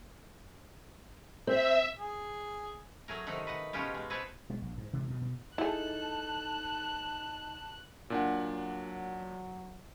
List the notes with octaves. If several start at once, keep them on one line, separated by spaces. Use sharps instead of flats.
C4 E5
G#4
F#3 A3 G#4 A#4
C3 D#3 A3 D#4 D#5 F#5
B4 D#5 F#5
B2 G#3 C#4 F4 G4
G#3
C4 G#4 A4 B4 C#5
B2 G#3
A#1
G#2
C3 E3 G#3
B2
B2
D#4 E4 G#4 A4 A5 F#6
A#2 F#3 D4 F#5